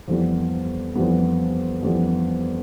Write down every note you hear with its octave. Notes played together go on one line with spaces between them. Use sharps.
F2 E3 G3 B3
F2 E3 G3 B3
F2 E3 G3 B3